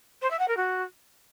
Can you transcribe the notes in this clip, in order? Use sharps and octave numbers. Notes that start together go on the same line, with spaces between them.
C5
E5
F#5
A#4
F#4